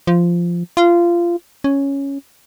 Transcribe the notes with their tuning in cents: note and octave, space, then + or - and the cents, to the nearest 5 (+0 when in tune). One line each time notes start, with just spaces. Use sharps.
F3 -10
F4 -20
C#4 +0